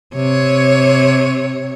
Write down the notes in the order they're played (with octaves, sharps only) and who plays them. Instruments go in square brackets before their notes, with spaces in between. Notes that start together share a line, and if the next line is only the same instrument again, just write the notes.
[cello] C3 C#5